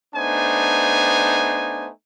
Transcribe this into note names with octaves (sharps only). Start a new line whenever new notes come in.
A3 B3 D4 D#4 C5 G#5